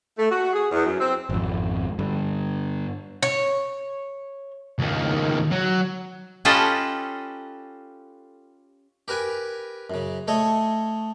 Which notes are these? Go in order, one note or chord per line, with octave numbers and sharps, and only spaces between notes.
A3
F#4
G#4
E2
F#2
C4
G#1 F2
G2 D3
C#5
C#2 D#3
F#3
C#4 F4 G4 A4 B4 D#5
G4 A#4 B4 G#5
F#2 C#3
A3 A4 C#5 D#5